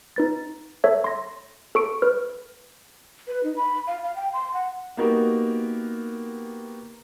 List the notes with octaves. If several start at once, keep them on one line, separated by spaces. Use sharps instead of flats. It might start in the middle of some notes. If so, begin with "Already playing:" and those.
D#4 B4 A6
A4 C#5 E5
C6 A#6
A4 C#6 D7
B4 F6
B4
D#4
B5
F5
F5
G5
C6
F#5
A#3 B3 D#4 F#4 G4 A#4